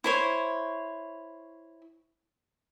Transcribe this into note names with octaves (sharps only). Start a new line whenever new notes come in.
E4 C5 C#5